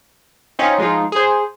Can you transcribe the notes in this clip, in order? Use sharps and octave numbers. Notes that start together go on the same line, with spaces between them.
C4 C#4 D#4 F4
F3 G#3 D#4 F4
G#4 C5